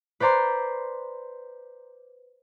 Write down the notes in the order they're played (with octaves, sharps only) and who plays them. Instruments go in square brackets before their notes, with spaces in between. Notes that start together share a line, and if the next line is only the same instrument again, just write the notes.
[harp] B4 C5 D5 A#5 C6